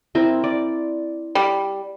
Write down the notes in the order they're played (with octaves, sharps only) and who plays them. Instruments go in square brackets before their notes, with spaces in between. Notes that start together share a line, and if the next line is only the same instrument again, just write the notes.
[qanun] C4 E4 A#4
D5
[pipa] G3